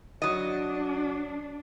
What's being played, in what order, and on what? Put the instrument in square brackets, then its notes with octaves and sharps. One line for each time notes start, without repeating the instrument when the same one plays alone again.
[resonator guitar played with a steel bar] F#3 D#5 [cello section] D4